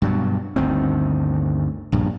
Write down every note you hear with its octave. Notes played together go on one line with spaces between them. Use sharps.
G2 B2 F#3
G1 D2 D#3 C4
A#1 G2